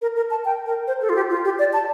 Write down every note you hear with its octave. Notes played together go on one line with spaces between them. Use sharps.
A#4
A#4
A5
G5
A#4
C5
A4
F4
G4
F4
G4
D5
A5